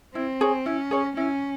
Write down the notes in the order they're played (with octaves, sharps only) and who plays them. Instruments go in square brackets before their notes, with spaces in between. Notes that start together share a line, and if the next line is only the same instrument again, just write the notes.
[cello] C4 [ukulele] E4
[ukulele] G#4 C#5
[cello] C#4 [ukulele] E4
[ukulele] G#4 C#5
[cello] C#4 [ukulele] E4